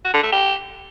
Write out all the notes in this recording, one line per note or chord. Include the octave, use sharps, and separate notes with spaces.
F#4
D3
A3
G4